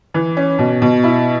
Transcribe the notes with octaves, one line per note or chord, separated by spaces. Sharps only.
E3
C#4
B2
B2
E4